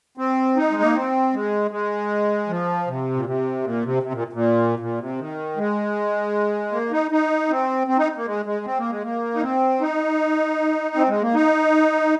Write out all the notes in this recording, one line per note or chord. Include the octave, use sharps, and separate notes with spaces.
C4
D#4
G#3
A#3
C4
G#3
G#3
F3
C3
A#2
C3
A#2
C3
C3
A#2
A#2
A#2
C3
D#3
G#3
A#3
D#4
D#4
C4
C4
D#4
A#3
G#3
G#3
C4
A#3
G#3
A#3
D#4
C4
D#4
C4
G#3
A#3
D#4